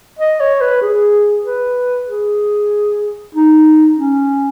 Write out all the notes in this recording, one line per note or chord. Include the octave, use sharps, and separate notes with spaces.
D#5
C#5
B4
G#4
B4
G#4
D#4
C#4